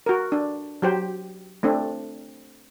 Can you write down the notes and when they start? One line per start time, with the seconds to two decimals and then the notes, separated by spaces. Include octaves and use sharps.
0.06 F#4 A#4
0.32 D4
0.82 F#3 G4 C5
1.63 A3 C4 D4